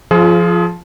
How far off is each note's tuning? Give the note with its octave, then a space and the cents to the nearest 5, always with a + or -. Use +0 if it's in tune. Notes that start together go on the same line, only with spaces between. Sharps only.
F3 +0 F4 -15 G#4 +30